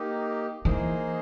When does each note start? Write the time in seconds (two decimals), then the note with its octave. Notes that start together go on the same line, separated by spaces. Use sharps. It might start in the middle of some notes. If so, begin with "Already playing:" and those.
Already playing: A#3 D#4 G4
0.65 E3 A#3 D#4 G#4 C5